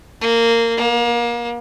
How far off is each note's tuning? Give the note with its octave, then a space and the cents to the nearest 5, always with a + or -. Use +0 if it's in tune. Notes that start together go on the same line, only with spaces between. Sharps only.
A#3 -15
A#3 +30